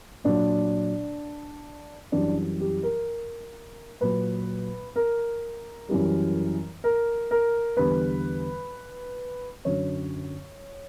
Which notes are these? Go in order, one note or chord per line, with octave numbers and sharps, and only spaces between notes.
A#2 F#3 D4
F#2 E3 G3 D4
G4
A#4
A#2 F#3 B4
A#4
F#2 E3 G3
A#4
A#4
E2 D3 G3 B4
F#2 D3 F#3 C#5